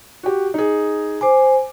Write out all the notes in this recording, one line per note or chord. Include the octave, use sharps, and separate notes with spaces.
F#4 G4
D#4 G#4
C5 G#5 D6